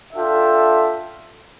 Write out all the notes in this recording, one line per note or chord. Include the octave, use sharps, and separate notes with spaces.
D4 F4 A4 E5 G5